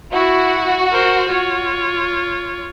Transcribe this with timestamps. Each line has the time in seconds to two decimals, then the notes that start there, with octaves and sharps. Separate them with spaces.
0.13 E4 F#4
0.92 A#4 C5
1.28 F4 C#5